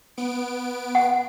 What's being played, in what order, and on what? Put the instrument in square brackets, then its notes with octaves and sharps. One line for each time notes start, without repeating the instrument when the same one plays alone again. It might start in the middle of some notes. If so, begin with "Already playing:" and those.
[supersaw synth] B3 D7
[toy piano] F#5